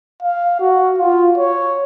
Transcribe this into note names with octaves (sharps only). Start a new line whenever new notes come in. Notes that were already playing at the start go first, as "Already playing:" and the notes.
F5
F#4
F4
C#5